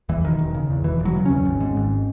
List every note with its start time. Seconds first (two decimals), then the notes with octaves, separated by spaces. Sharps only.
0.09 E2 E3
0.24 E1 D#3
0.39 E1
0.54 C#3
0.70 E2
0.84 E1 E3
0.99 E1
1.05 F#3
1.15 C#3
1.25 E2 C#4
1.45 G#1
1.60 G#2
1.76 G#1